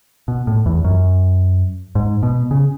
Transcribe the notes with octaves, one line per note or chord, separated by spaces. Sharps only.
B2
A2
E2
F#2
G#2
B2
C#3